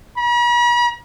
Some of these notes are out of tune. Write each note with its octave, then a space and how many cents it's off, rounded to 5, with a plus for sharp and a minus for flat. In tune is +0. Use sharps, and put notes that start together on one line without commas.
B5 -45